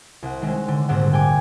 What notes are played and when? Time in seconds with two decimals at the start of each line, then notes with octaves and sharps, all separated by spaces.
0.23 C2 F#5
0.42 D#3 G#3 C4 C#4
0.68 D3
0.89 D#1 A#1 G#2 C4 F#5
1.13 G5 G#5 D6